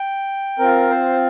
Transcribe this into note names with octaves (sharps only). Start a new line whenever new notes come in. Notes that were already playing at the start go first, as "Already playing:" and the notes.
Already playing: G5
C4 F4 A#4
C5